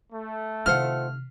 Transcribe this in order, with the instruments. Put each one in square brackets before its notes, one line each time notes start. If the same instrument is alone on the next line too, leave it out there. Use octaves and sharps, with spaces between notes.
[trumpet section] A3
[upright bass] C3 D#3 [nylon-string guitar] F4 C5 F#5 [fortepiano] F6